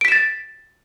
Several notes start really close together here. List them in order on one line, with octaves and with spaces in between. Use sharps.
D7 B6 E7 A6